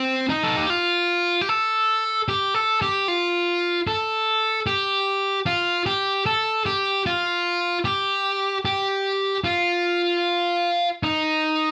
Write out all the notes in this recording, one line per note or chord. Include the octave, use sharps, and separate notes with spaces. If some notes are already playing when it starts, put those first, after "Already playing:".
Already playing: C4
D#4
A4
G4
F4
G4
A4
G4
A4
G4
F4
A4
G4
F4
G4
A4
G4
F4
G4
G4
F4
D#4